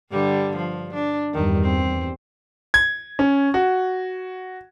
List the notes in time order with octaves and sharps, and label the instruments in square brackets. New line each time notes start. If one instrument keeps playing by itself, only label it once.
[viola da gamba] G2 D3 G3
F3
D4
[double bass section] E2 G2 G3 [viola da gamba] D#3
[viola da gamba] C4
[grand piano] G#6
C#4
F#4